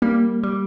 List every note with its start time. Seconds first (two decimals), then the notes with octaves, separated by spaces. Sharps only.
0.02 G3 A#3
0.43 G3